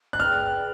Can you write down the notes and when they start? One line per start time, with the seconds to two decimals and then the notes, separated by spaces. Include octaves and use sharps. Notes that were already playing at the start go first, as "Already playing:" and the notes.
0.13 F#6
0.19 G#4 B4 D5 G5 F6